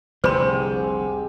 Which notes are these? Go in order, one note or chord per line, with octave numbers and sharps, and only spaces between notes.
F1 C2 G#2 D3 C4 G4 C5 B5